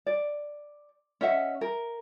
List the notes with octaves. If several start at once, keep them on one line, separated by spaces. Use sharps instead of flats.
D5
C#4 D#5 E5 F#5
A#4